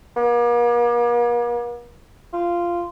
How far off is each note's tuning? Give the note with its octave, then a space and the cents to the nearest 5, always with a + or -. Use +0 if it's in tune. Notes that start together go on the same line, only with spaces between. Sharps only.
A#3 +45
F4 -10